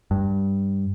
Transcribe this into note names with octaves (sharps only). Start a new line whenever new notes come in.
G2